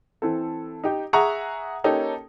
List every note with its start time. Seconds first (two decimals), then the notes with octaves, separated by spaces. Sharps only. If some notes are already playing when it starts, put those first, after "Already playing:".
0.22 E3 C4 A4
0.84 D#4 G4
1.13 G#4 E5 F#5 A#5 C#6
1.84 A#3 C#4 D#4 G4 A4